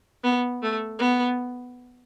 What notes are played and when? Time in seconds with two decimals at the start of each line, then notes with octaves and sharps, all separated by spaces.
0.24 B3
0.62 A3
0.99 B3